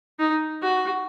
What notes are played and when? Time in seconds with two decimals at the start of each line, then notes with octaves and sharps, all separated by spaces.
0.19 D#4
0.62 F#4